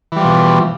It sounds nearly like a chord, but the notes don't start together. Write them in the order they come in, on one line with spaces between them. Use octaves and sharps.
E3 G3 F3 B2